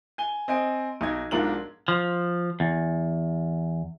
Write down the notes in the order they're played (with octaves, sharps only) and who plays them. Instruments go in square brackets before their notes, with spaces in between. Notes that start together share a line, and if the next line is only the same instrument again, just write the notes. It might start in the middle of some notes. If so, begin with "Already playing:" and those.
[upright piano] G#5 G7
C4 D#5 G#5 D7
B1 D#4 G#6
B1 G#2 D4 F4 A#4 F#7
[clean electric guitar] F3
E2